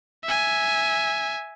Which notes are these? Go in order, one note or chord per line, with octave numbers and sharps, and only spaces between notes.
E5 G#5